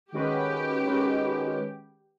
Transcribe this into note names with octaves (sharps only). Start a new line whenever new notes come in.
D#3 G#3 C#4 F#4 G4 B4
D#3 G#3 C#4 F#4 B4